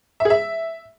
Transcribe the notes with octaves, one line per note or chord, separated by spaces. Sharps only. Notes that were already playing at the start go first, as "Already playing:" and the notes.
E5
G#4
E5